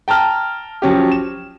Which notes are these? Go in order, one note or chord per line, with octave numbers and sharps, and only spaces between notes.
G5 A5 A#5 F6
F3 F#3 C#4 G4
E7